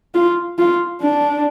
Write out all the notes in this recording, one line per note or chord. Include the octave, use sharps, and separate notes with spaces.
F4
F4
D4